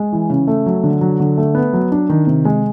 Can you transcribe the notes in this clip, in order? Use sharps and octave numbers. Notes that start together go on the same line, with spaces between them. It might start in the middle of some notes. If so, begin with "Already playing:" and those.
Already playing: G#3
E3
C#3
A3
F#3
D3
F#3
D3
A3
B3
F#3
D4
D#3
C3
G#3